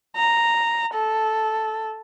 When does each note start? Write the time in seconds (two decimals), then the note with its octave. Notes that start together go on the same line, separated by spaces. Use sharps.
0.16 A#5
0.94 A4